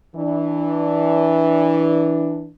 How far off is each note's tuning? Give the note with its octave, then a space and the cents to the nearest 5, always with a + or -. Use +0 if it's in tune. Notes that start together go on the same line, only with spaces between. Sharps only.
E3 -15 D4 +0